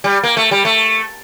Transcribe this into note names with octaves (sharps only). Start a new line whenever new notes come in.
G3
A#3
A3
G3
A3